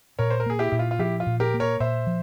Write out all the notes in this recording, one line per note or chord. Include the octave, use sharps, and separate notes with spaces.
A#2 A#4 C#5
C5
A#4
A#3 G#4
E4 G4
A#2 E4
F4
F4
F3 E4 G4
F4
A#2
G4 A#4
A#3
A#4 C#5
A#2 C5 E5
F3